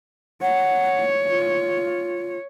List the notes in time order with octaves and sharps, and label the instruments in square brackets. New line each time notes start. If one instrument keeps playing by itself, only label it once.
[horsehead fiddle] C#5 [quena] F#5
[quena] F4